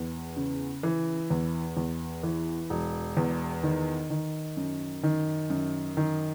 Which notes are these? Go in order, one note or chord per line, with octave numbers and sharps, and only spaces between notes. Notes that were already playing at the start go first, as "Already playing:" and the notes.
Already playing: E2
C#3
E3
E2
E2
E3
E1
E2
D#3
D#3
F#2
D#3
F#2
D#3